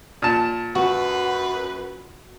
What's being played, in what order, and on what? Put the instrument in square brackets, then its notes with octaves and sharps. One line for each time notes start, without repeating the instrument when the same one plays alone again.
[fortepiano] A#2 A5
[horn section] F#2 B4 [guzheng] F#4